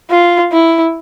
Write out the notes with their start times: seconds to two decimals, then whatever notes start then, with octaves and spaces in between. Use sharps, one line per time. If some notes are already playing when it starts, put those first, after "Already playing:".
0.10 F4
0.52 E4